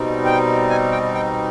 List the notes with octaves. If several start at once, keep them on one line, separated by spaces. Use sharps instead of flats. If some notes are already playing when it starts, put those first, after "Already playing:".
Already playing: B2 G3 C4 D#4
G5
G#5
G5
G5